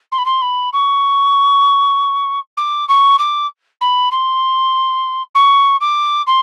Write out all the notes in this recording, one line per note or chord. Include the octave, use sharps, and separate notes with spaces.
C6
B5
C6
B5
C#6
D6
C#6
D6
B5
C6
C#6
D6
C6